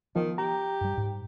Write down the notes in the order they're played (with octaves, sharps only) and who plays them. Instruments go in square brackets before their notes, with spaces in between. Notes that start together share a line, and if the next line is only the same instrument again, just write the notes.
[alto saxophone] D#3 [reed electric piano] F3 [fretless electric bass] B3
[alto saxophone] G4 [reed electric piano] A#5
[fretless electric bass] G2 G3
G#2